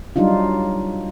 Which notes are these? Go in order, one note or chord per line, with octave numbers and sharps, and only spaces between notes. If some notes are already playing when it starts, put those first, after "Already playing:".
F#3 G3 D4 D#4 F4